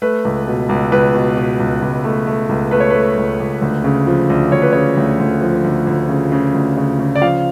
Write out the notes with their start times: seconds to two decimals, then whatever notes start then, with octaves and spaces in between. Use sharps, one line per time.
0.02 A3 B4
0.25 C#2
0.47 B2
0.69 C#2
0.92 C#2 B4
1.15 B2
1.37 B2
1.60 C#2
1.82 C#2
2.04 A3
2.27 A3
2.49 C#2
2.71 A3 B4
2.80 C#5
2.90 A3 B4
3.17 C#2
3.40 C#2
3.62 D2
3.84 C#3
4.07 F3
4.30 D2
4.52 D2 C#5
4.62 B4
4.73 C#3 C#5
4.97 D2
5.19 D2
5.42 F3
5.64 D2
5.87 D2
6.09 C#3
6.32 C#3
6.54 D2
6.77 C#3
6.99 C#3
7.15 D5
7.21 F3 F5